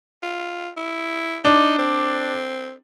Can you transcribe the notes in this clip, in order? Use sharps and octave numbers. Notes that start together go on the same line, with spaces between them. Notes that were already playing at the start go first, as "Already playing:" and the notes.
F4
E4
D4 D#4
C4